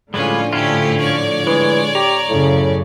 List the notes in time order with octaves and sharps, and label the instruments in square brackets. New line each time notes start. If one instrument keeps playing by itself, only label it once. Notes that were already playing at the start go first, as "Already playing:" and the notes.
[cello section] A2 D3 F3 [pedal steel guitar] G3 G#3 B4 [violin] C#4 F4
[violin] A3 G4 [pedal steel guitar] C#4 E4 F4
[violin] C#5 D5
[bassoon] E3 [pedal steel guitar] G#3
[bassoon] G4 [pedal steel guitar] A#5
[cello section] F#2 C#3 [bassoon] A2